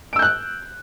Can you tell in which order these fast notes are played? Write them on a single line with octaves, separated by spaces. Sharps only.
D7 E6 G6 F#6